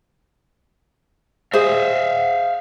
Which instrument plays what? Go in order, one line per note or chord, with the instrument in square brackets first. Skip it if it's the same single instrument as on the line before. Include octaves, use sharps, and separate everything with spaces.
[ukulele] G#4 C5 [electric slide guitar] E5 F5